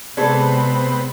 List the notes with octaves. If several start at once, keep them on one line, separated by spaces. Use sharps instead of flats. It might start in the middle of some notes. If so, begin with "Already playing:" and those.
C3 G#3 B3 C4 G#4 A4 D5 A5